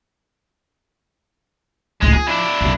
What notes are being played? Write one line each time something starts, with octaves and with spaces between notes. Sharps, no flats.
C#2 A2 G#3
F3 G#4
D4 E4
B1 F#2